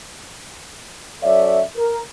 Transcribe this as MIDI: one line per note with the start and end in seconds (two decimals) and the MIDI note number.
1.23 1.62 54
1.23 1.62 61
1.23 1.62 69
1.23 1.62 73
1.23 1.62 74
1.23 1.62 76
1.76 1.98 70